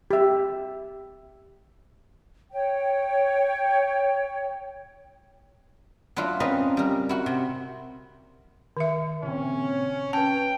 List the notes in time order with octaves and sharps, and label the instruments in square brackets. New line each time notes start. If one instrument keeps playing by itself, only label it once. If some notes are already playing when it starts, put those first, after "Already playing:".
[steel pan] G4 E5
[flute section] C#5 G5
[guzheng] F#3 D4 E4 F4
C#3 C4 C#4 B4 D#5 A#5
G3 A#4
E4 F#4
C3
[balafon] D#3 E5
[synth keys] A#2 C#3 C4 [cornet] C#4
[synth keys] C#4 B4 [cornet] G5 [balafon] A5